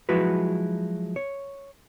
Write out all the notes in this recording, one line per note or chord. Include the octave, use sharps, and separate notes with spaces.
F3 F#3 G#3 E4 F#4 B4
C#5